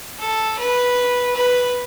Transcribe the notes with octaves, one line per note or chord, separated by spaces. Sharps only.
A4
B4
B4